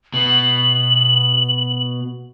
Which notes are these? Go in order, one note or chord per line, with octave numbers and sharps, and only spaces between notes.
B2 F#7